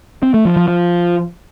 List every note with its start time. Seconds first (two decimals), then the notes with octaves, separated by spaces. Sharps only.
0.23 C4
0.34 A3
0.45 F3
0.56 F3
0.68 F3